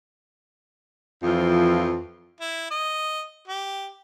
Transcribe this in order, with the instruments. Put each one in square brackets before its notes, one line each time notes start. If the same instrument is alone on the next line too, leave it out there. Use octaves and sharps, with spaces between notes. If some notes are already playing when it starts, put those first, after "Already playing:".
[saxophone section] F2 E3 F3
[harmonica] E4
D#5
G4